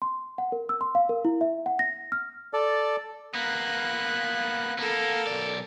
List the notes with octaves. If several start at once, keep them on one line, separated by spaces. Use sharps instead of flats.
C6
F#5
A#4
E6
C6
F5
A#4
E4
E5
F#5
A#6
F6
A4 D5
A#3 B3 F#6
A#3 B3 A4 A#4
B1 D5